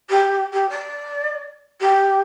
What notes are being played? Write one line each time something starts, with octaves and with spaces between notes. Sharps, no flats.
G4
G4
D5
G4